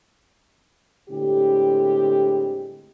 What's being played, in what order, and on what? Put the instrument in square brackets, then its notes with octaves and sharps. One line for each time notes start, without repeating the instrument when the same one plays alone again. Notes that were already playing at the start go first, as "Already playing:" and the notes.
[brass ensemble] A2 D3 G3 G#3 C4 G4